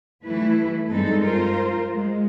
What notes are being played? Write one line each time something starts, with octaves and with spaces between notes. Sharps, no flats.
E3 G3 A3 E4 B4
G2 G#3 C4 D#4 A4
F4 A#4 C5
G#3